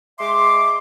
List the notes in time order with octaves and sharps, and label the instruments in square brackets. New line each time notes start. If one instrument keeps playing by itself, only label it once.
[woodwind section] G#3 E5 C6 D6